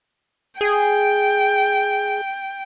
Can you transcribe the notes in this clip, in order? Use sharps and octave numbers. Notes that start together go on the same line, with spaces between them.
G#4 G5